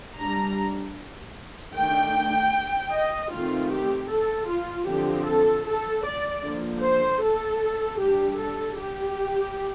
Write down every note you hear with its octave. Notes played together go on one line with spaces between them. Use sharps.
G3 D4 A#5
D#3 A3 D4 G5
D#5
D#3 A3 C4 F4
G4
A4
F4
D3 F3 C4 G4
A4
A4
D5
D3 F3 A#3
C5
A4
G3 D4 G4
A4
G4